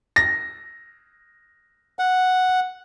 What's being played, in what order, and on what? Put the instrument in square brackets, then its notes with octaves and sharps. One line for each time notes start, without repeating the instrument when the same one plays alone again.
[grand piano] A#6
[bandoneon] F#5